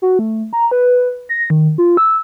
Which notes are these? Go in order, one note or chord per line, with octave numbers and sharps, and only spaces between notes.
F#4
A3
A#5
B4
A#6
D#3
F4
E6